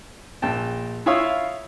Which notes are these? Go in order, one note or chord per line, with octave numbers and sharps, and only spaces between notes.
A#1 G5 A5
E4 F4 C#5 F5 D#6 E6